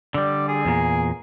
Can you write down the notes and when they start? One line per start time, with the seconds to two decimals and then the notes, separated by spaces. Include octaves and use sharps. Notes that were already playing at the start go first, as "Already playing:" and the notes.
0.14 D3 G3 D5
0.48 G#4
0.65 E2 A#2 A#3